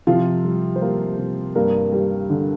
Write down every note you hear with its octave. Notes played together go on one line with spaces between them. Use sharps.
C3 F3 F4
G3
C5
G3 A#3 A#4
C3
G2 A#3 A#4
G3
D3